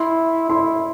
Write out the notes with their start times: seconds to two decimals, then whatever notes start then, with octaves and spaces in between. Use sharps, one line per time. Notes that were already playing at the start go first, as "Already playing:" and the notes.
Already playing: E4 C6
0.50 E4 C6